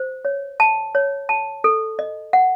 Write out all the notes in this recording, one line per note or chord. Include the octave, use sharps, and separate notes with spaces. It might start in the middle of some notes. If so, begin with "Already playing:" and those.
Already playing: C5
C#5
A5
C#5
A5
A4
D#5
F#5